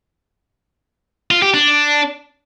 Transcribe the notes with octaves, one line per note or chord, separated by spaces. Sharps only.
F4
G4
D4